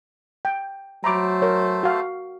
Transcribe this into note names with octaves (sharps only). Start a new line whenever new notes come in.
G5
F#3 A3 A4 C5 A#5 B5 D6
A#4 C#5
F#4 F5